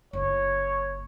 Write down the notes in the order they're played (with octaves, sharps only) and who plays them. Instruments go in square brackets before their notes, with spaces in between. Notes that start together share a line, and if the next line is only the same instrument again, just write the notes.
[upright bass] F#1 F4 [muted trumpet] C#5